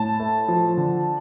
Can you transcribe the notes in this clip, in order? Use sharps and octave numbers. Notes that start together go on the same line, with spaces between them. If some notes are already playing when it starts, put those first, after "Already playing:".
Already playing: A2 A5
A3
F3
D3